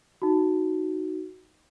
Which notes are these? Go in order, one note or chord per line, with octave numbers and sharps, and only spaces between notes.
D#4 F#4